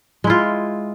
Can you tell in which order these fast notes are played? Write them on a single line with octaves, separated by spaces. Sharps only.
G#3 E4 F4